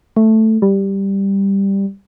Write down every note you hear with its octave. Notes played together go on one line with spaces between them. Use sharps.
A3
G3